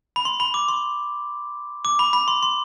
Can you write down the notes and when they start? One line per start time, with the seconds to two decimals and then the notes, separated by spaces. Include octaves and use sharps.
0.16 B5
0.25 C6
0.40 B5
0.54 D6
0.68 C6
1.85 D6
1.99 B5
2.13 B5
2.28 C6
2.43 C6